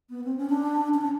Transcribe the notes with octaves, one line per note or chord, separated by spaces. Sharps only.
B3
C4
C#4
D4
C#4
D4